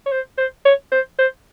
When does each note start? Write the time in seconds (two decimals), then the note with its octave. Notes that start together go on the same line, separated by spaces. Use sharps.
0.06 C#5
0.11 C5
0.38 C5
0.65 C#5
0.92 C5
1.19 C5